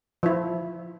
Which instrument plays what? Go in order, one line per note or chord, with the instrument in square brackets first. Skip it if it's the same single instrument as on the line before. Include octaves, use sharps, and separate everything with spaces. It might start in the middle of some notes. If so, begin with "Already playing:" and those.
[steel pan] F3 E4